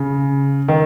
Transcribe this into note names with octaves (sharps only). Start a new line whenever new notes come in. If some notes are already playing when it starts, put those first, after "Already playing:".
Already playing: C#3
D#3